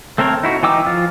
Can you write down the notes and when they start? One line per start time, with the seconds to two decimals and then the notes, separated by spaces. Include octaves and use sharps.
0.18 A3 C4 A4 A#4 C#5
0.43 D#4 E4 F#4
0.63 E3 D#4 G5 D6 E6
0.86 F3 F4